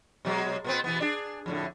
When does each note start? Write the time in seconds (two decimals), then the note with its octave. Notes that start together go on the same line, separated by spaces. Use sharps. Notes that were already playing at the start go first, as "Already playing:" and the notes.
0.25 B2 F#3 G#3
0.64 A#2 B3 C4
0.84 B2 E3 B3
1.00 D4 G4 G#4
1.46 F2 A2 D3